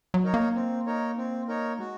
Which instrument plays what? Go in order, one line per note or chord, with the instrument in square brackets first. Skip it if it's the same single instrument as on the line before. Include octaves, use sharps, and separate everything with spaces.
[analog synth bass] F#3
[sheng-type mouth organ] D#4 A#4 C#5
[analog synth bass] A#3
[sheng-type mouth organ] C4
D#4 A#4 C#5
C4
D#4 A#4 C#5
[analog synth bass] G#3 [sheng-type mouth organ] F#4